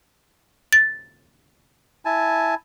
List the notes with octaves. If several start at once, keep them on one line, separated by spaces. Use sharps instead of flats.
A6
E4 G#5 A5